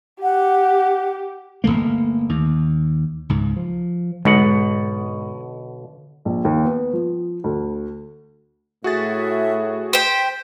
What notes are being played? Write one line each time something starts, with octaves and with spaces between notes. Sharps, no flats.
G4 F#5
G1 F#2 A3 A#3
D#2
C#2 G#2
F3
B1 G#2 B2 D3 G#3 F#5
A#1
D#2
B3
F3
D2
A2 F#4 G#4 E5 A6
C5 G5 B6